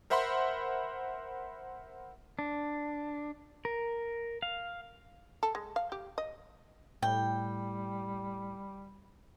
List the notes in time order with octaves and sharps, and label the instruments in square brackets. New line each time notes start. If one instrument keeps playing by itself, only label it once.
[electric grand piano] A#4 C5 E5 F#5 B5 C6
[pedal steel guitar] D4
A#4
F5
[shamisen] A4
G#3
F5
G4
D#5
[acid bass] A2 [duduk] G3 [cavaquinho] G5